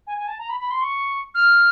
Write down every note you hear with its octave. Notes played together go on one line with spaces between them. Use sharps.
G#5
G#5
A5
A#5
B5
B5
C6
C#6
F6